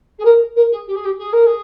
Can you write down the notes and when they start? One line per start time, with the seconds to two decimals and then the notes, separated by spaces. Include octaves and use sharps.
0.18 G#4
0.24 A#4
0.55 A#4
0.71 G#4
0.87 G4
0.95 G#4
1.04 G4
1.18 G#4
1.32 A#4
1.46 G#4